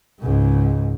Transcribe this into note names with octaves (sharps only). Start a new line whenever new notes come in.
C#2 G#2